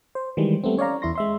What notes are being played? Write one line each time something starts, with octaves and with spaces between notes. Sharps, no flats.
C5
D#3 E3 G3 G#3
G3 A3 B3 C4
C#4 C#5 D5 F5 A#5
E2 E4 C6 A#6
G#3 E5 C6